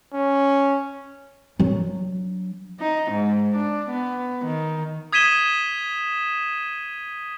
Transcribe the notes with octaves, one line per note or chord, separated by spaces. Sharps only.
C#4
F#3 D4
D#4
G#2
D4
B3
D#3
D#6 G#6 B6 D#7 E7 G7